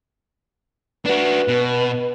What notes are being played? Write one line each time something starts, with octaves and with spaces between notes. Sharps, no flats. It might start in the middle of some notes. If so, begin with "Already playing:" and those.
D4 F#4 B4
B2